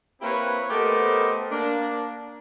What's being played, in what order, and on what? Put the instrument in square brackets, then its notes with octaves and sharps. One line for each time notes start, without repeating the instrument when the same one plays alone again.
[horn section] A#3 C4 E4 G4 B4 C#5
A3 B3 G4 A#4 C5 D#5
A#3 D4